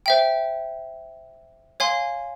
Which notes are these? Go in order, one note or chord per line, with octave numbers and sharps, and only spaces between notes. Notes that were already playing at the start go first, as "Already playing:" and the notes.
C5 E5 G5
C#5 F5 G#5 C6